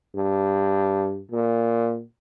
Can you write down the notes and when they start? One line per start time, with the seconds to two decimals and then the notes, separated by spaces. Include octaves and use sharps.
0.15 G2
1.31 A#2